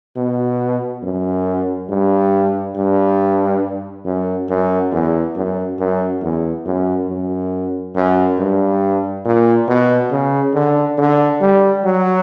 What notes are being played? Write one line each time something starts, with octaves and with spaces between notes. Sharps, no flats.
B2
F#2
G2
G2
F#2
F#2
E2
F#2
F#2
E2
F#2
F#2
F#2
G2
A#2
B2
C#3
D3
D3
G3
F#3